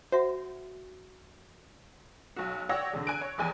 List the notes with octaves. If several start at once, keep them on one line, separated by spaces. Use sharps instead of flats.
F#4 C5 E5 F#5
B1 F#4
C#5 D5 F#5 G5 E6 A#6
E2 D3
G#5 F#6 D7
C#5
F1 E2 G5 G#5